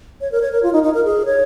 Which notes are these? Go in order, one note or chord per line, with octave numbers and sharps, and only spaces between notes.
C#5
A#4
C#5
A#4
F4
D#4
D#4
A#4
G#4
C#5